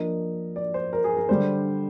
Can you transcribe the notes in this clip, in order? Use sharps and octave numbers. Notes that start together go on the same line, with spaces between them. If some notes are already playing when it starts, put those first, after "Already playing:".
Already playing: F3 A#3 D4 D#5
D5
C5
A#4
G#4
A#4
D3 G3 D4 C5